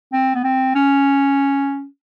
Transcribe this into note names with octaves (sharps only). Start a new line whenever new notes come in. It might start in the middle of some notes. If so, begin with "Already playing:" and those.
C4
B3
C4
C#4